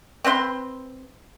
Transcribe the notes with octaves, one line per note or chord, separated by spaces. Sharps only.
C4 B4 F5 C6